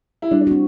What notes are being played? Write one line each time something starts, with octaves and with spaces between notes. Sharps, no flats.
E4
G3 D4
D4
C4 F#4